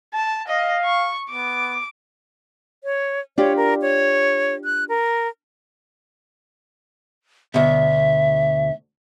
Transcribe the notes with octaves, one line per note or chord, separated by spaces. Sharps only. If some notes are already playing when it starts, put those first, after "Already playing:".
A5
D#5 F5
C#6
B3 D6
C#5
D4 F4 G4 C#5
A#4
C#5
F#6
A#4
D2 B2 E5